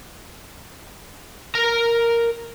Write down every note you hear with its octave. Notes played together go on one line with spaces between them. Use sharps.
A#4 A#5